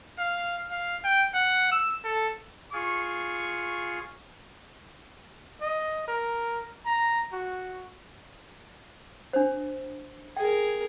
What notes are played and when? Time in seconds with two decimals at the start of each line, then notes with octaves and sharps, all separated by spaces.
0.19 F5
0.71 F5
1.04 G5
1.34 F#5
1.72 E6
2.04 A4
2.73 F4 G#4 C#6
5.62 D#5
6.08 A#4
6.86 A#5
7.33 F#4
9.33 D4 C5
10.37 G#4 A#4 G5